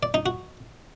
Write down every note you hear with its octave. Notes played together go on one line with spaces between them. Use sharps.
D5
D#4
F#4